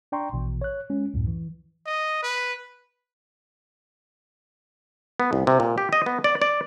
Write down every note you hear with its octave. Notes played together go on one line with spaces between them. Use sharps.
D4 D5 G5 A#5 C6 C#6
A#1 B2 E3
C#5 F#6
G#3 C#4
C#2 F#2 A2
E3
D#5
B4
B3
C2
C3
A#2
G4
D#5
B3
D5
D5